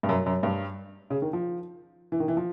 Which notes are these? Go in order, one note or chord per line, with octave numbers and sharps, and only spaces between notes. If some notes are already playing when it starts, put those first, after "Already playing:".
G2
F#2
F#2
G2
C#3
D#3
F3
E3
D#3
E3
F3